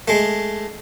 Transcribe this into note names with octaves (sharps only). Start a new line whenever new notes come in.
G#3 A3